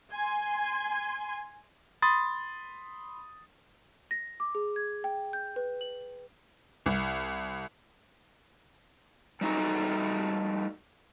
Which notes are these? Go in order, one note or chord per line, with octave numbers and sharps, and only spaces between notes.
G#5 C6
B5 C6 D#6 A6
A#6
D6
G#4
G#6
G5
G6
B4
F#7
C2
G3 A3 D#4 F#4 A4